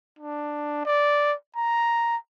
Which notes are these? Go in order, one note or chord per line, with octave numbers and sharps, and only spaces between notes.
D4
D5
A#5